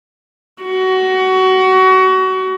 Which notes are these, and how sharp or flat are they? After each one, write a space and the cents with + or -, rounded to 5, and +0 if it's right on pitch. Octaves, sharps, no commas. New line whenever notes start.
F#4 +25